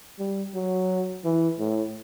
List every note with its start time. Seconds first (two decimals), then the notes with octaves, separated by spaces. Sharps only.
0.19 G3
0.55 F#3
1.25 E3
1.59 A2